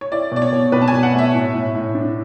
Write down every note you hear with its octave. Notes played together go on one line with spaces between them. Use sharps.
C#5
E4 D5
B2 D5
C#5
B2
B2 B4
A5
B2 G#5
F#5
A3
E5
A2
A2
A2
D4